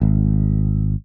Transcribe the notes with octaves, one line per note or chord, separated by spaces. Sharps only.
G#1